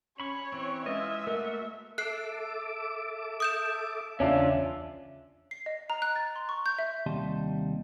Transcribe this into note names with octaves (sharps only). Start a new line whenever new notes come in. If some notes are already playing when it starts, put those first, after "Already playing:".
C#4 C#5 B5 C#6
E3 C4
G#3 E4 F4 B4 D#5 E5
A3 A#3 F#4 A#4
A4 E5 D6 F#6 C7
D#6 G6 E7
E2 C#3 C#4 D4 F4 E5
C7
D#5
A#5
F#6
A6
C6
C#6
G6
E5
D#2 C3 G3 D#5 A5 C6